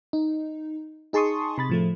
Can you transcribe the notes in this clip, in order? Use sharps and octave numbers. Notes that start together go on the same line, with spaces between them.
D#4
D#4 G#4 A5 C6 C#6 D#6
C3 B5 A6
A2 F3 A3